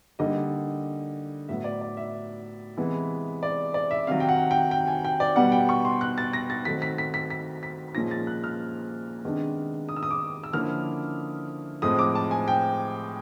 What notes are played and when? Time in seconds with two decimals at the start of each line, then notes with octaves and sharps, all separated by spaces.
0.19 D3 G3 A#3 D#4 D#5
1.49 A2 F#3 B3 E5
1.64 D5
1.81 D5
1.97 E5
2.77 C3 E3 G#3 B3 E4
3.43 D5
3.74 D5
3.91 E5
4.07 C3 D#3 F#3 F5
4.20 G5
4.29 F#5
4.51 G5
4.71 G5
4.87 G#5
5.05 G5
5.20 D5
5.36 B2 G3 B3 F#5
5.52 G5
5.69 C#6
5.85 C6
6.01 F#6
6.18 A6
6.33 A#6
6.50 A6
6.65 D#3 F#3 A3 C4 B6
6.82 B6
6.98 B6
7.14 B6
7.30 B6
7.63 B6
7.95 A#2 F3 G#3 C#4 F4 A#6
8.11 A6
8.27 F#6
8.44 F6
9.24 C3 D#3 G#3 B3 D4
9.89 D#6
9.96 E6
10.03 D#6
10.11 D6
10.43 E6
10.53 D3 F3 A#3 C#4 E4 F6
11.82 A2 F3 G#3 C4 D#6
11.99 D6
12.15 A5
12.31 G#5
12.48 G5